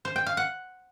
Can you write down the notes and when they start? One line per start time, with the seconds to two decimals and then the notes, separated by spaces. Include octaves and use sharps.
0.05 C5
0.16 G5
0.26 F5
0.37 F#5